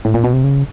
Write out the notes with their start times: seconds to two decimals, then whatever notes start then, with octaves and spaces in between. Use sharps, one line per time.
0.05 A2
0.14 A#2
0.24 B2
0.33 C3
0.44 C#3